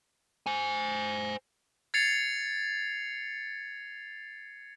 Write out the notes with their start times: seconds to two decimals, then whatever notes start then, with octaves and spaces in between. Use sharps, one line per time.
0.46 C5 G#5
1.94 G#6 A6 C7 C#7 F7